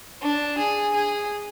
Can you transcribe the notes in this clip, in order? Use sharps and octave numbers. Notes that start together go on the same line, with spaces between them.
D4
G#4
G#4